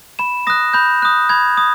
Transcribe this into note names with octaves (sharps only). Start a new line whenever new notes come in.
B5 E7
D#6 F#6 A#6
B5 G6
D#6 F#6
B5 G#6
D#6